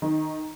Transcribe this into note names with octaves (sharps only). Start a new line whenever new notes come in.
D#3